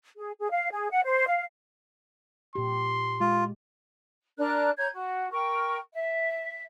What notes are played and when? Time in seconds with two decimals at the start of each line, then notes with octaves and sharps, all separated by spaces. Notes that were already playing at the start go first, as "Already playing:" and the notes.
0.17 G#4
0.38 G#4
0.51 F5
0.71 G#4
0.90 F#5
1.04 C5
1.27 F5
2.55 A#2 G4 C6
3.20 G#3 F4
4.38 D4 A#4 A#5 F#6
4.77 C#5 A#5 G6 G#6
4.93 F#4
5.31 A#4 G5 C#6
5.94 E5